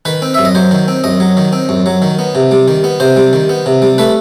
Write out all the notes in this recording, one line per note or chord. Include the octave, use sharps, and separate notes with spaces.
D#3 B4
C4
F#2 E5
D#5
F#3 C5
D#3
C4
F#2 D#5
F#3
D#3
C4
F#2
F#3
D#3
B3
C3
G3
D#3
B3
C3 C5
G3
D#3
B3
C3
G3
A3 B4